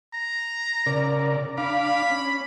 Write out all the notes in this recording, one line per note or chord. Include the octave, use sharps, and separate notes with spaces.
A#5
C#3 A#4 D5
D4 F5 B5 D6
C#4